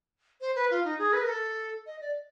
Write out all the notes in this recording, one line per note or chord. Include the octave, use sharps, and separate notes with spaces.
C5
B4
F4
D#4
G#4
B4
A#4
A4
D#5
D5